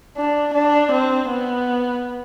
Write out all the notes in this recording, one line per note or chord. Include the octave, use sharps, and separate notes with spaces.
D4
D4
C4
B3